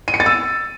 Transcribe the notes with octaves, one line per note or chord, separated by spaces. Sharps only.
D#7
C#7
A6
E6